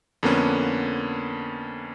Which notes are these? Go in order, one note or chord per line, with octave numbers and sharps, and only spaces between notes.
F2 D3 A#3 B3 C#4